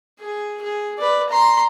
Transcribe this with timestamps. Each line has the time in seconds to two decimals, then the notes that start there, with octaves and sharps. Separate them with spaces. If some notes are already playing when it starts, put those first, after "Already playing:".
0.20 G#4
0.62 G#4
0.98 B4 D5
1.30 A#5 C6